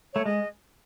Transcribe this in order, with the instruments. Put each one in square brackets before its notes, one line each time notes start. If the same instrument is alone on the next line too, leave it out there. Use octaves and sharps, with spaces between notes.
[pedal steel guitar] A3 [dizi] C#5
[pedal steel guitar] G#3 [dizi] D#5